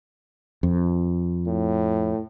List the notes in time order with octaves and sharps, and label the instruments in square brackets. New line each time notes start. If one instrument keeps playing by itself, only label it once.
[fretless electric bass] F2
[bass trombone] A2